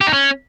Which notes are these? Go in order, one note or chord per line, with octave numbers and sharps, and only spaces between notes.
G4
D#4
C#4